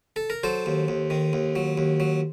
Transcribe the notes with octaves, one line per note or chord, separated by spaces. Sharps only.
A4
A#4
F#3 A4 C5
D#2
D#2
D#3
D#2
F#3
D#2
F#3